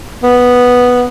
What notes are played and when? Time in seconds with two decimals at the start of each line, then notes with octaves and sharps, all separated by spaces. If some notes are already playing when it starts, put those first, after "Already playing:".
0.23 B3